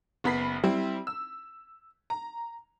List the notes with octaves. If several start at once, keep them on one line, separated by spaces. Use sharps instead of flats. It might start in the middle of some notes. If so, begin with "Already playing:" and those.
F#1 B3 B5 B6 C7
G3 C4 E4
E6
A#5